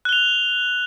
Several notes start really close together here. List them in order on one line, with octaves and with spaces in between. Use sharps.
F#6 G7 F7